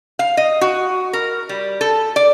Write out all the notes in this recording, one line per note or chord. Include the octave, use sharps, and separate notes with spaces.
F5
D#5
F#4
A#4
G3
A4
D5